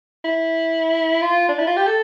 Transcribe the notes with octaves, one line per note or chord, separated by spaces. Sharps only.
E4
F4
D4
E4
F4
G4
A4